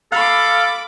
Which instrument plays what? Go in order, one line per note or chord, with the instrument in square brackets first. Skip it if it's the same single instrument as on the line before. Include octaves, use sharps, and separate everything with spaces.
[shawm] A4 [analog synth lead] F5 [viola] B5 D6